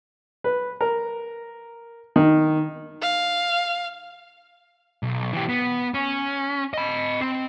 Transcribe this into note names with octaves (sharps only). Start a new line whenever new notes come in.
B4
A#4
D#3
F5
B1
E3 G4
B3
C#4
D#5 B5
C4